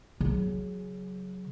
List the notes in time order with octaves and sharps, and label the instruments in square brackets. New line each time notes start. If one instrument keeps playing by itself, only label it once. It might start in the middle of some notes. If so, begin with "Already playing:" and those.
[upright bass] C#3 F#3